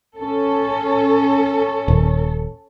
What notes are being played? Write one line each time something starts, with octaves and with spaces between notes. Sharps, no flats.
C#4 A4
D#1